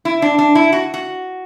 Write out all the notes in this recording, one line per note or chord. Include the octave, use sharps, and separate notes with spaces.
E4
D4
D4
E4
F#4
F#4